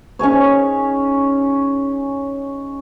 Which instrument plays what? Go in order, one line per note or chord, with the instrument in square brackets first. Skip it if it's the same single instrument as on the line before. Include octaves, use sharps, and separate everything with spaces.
[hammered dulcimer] C#4 D#4 G#4 C#5